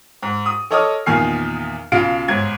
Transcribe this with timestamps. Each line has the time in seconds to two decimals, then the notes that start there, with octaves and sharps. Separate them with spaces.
0.22 G#2
0.46 D#6
0.71 A4 C#5 D#5 D6 D#6 F6
1.06 E2 A#2 D#3 G#5 F6 C7
1.92 B1 C#3 F4 F5 D7
2.28 G1 G#2 G#6